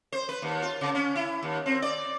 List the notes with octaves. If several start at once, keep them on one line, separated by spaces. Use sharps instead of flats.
C5
B4
D#2
F4
C#3
C#4
E4
D#2
C4
D5